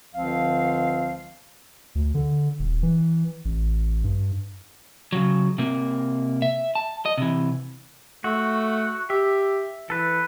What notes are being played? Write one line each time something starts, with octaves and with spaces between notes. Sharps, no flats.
C#2 D3 F3 C4 F5
D2
D3
D#1
E3
A1
G2
C#3 F#3
C3 A#3
E5
A5
D#5
C3 E3
A3 F#4
G4 E5
E3 A4 B4